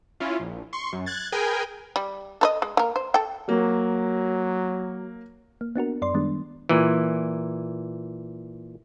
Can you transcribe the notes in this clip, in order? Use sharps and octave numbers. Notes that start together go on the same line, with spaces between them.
C#4 E4 F4
A#1
C6 C#6
F#2
F#6 G#6 A6
G#4 A#4 B4 G5 G#5
G3
A4 B4 D#5
G#3
A#3 A#4
C5
A4 G5
F#3 A#3
A#3
B3 D4 F#4 A#4
F#2 D5 C6
D#3 G3 G#3 B3 D4
A#2 E3